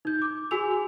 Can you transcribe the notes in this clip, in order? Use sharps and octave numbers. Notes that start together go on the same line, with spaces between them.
D#4 G6
D6
F#4 G#4 G#5 E6 F7